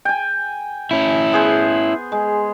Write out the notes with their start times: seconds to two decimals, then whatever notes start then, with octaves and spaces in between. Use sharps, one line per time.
0.05 G5 G#5
0.91 C#4 E4
1.33 B3 G#4 C5
2.12 G#3